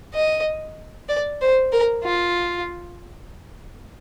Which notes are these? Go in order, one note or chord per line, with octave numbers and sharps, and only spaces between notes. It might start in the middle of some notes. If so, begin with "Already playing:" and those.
D#5
D5
C5
A#4
F4